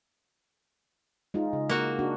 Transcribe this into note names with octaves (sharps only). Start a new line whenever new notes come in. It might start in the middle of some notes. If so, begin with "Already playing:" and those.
G#3 D#4 F4
C#3
A#3 F#4
D4 F#4 A#4